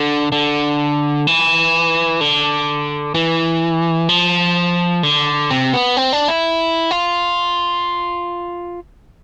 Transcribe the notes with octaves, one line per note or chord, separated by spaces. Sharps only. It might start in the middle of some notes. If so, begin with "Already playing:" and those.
Already playing: D3
D3
E3
D3
E3
F3
D3
C3
B3
C4
D4
E4
F4